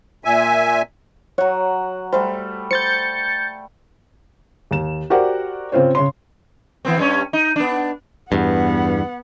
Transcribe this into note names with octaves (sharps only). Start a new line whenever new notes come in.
A#2 E5 G#5
F#3 C#5 F#5
G3 A3 A4 C5
C5 G6 A6 C#7
D#2 E7
F#4 G4 A#4 C5 D5 F#5
C#3 C4 F4 C5 C#5
C#3 C#5 C6
E3 B3 C4
G2 G3 C#4
D#4
B3 D4
E2 G2 B3 F#5